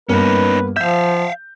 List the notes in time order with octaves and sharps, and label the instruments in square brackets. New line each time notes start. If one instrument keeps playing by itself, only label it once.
[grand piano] G2 A#3 B3 [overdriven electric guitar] C#4 D#4 [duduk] B4
[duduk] F3 [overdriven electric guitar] E5 F5 [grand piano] G6